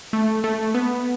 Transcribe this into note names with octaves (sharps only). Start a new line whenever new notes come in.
A3
A3
B3